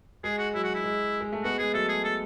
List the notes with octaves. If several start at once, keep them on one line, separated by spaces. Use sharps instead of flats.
G#3 G#4
F#4
F#3 E4
F#4
E4
G#3
G#3
A3
G#3 B3 F#4
G#3 G#4
F#3 A3 A4
G#4
A4